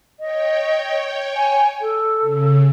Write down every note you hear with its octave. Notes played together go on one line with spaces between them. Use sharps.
C#5 D#5 G5
G#5
A4
C#3